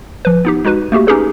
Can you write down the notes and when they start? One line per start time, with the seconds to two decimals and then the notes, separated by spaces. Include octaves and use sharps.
0.25 F3 B4
0.45 B3 D#4 G4
0.65 G#3 D#4 F#4 B4
0.92 A3 A#3 F#4 G4
1.07 C#4 D#4 G4 G#4 B4